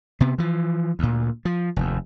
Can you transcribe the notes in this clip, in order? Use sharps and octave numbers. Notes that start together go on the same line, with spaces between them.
C3 B3
E3 F3
D2 A#2
F3
F1 D#2